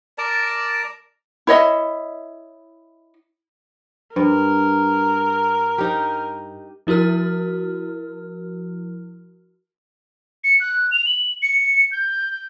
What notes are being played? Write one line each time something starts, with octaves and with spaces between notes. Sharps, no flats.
A#4 D5 A5 A#5
E4 C#5 D#5 E5
G2 A#4
D#4 G4
F3 E4 F#4 A#4 F6
C#7
F#6
F7
F#7
C#7
G6